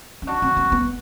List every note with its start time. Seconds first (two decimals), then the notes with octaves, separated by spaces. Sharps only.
0.22 C#4
0.27 D4 F#4
0.42 C4
0.57 B3
0.72 B3